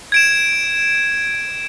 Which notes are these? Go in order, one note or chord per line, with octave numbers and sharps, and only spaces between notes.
G#6 D7 E7